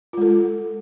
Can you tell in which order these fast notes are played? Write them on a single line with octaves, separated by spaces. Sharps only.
F4 G#3 A4